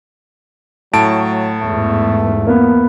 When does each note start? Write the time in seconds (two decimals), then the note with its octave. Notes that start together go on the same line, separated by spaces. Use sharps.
0.93 A2 F#3 A5 D7
1.61 E2 G#2 A3
2.47 A#3 B3